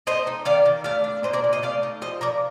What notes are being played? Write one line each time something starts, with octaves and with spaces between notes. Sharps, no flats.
A3 C5 D#5
D#4
D#3 D5 F5
D#3
A3 D5 F5
D4
A#2 C5 D#5
A#4 D5
A#2
C5 D#5
A3 D5 F5
D#4
F3 C5 D#5
F3 A#4 D5